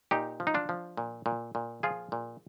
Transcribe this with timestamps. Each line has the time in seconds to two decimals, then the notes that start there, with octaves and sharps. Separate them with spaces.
0.11 A#2 D#4 G4
0.40 F3
0.47 D#4
0.54 D4 F4
0.69 F3
0.97 A#2
1.26 A#2
1.55 A#2
1.83 F3 F4 G#4
2.12 A#2